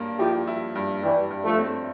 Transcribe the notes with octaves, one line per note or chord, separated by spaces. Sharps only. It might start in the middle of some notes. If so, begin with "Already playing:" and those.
Already playing: G2 A#3
F3 E4 G4
E4
G2
G2 E3 G3
G2
F3 A3
C4